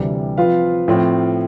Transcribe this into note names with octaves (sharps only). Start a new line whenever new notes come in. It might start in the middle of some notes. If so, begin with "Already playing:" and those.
Already playing: D2 C3 E3 G3
F3 C4 F4 B4 F5
A2 F3 C4 F4